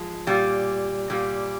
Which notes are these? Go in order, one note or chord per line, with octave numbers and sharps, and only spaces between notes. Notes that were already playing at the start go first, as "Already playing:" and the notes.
Already playing: F3 G#3
A#2 G3
A#2 G3